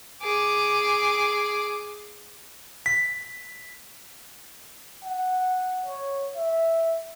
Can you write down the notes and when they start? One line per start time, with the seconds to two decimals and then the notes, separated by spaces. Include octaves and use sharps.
0.23 G#4 D6
2.86 B6
5.04 F#5
5.86 C#5
6.36 E5